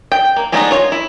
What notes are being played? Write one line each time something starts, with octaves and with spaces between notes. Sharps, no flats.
G5
A#3
G#3 A3 B3 D4 D#4
F4 C#5
E4